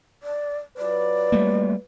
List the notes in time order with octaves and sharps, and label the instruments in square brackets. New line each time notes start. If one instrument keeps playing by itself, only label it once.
[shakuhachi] D5
[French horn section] F#3 F4 B4 [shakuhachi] D5
[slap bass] G3 A3 A#3